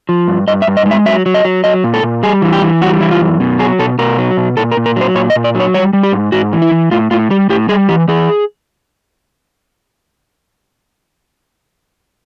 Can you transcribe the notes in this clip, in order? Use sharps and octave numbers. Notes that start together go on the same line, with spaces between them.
F3
G2
G2 D#5
E5
G2
D#5
G#3
E5
F#3 E5
F#3
D#5
F#3
F#3 D#5
A#2
A4
A#2
G3 G#4
E3
G4
E3
G3 F#4
E3 E4
F4
F#2
B2
F#3 G#4
B2 A4
B2 A#4
F#3
B2
A#2 A4
A#4
A#2
A#4
F#3 C5
A#2 C#5
D#5
A#2
D5
F#3
C#5
G3 C#5
G3
G4
G#2
G#2 F#4
E3
E4
E3
A2 F4
A2 F4
G3 G4
A2 G4
G3 G#4
E3 G4
E3 G#4